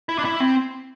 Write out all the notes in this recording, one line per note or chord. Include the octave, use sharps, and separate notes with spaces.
E4
D4
E4
C4